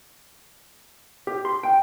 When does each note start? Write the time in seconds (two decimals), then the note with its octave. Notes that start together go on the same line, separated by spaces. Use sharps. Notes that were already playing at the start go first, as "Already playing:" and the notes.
1.27 G4
1.45 C6
1.63 G5